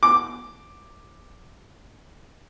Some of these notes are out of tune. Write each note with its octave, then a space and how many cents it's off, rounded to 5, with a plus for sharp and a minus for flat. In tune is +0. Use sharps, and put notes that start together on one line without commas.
D6 +5